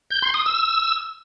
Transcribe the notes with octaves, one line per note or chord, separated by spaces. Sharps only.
G6
C6
D#6
E6